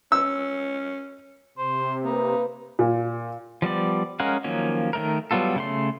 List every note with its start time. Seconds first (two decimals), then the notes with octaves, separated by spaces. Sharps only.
0.12 C#4 E6
1.58 C3 C5
2.04 A#3 D#4 B4
2.79 A#2
3.62 F3 G3 B3 D5
4.20 G#3 C#4 A#4 F5 F#5
4.44 D#3 F3 F#3 A#3 C#4
4.93 D#3 A3 A#4
5.31 F#3 G3 B3 F4 A4
5.56 C#3 A3 C6